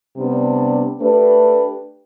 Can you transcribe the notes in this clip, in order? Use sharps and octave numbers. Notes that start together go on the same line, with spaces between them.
C3 G3 B3 D4
A3 D4 G4 B4